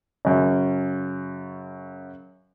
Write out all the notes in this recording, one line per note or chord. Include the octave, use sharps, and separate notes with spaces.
F#2 C#3